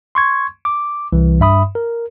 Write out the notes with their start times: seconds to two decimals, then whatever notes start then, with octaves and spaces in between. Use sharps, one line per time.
0.15 C6 C#6 G#6
0.65 D6
1.13 C2 E3
1.40 G2 E5 B5 D#6
1.75 A#4